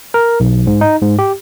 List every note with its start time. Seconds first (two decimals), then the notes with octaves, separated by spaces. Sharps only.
0.14 A#4
0.40 B1
0.67 G#2
0.81 D#4
1.02 G#2
1.19 G4